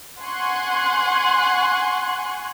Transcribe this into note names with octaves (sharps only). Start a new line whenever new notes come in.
F#5 G#5 C6 C#6 F#6 G#6